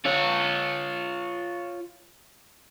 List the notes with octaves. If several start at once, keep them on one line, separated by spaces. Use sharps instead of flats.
F4 C#5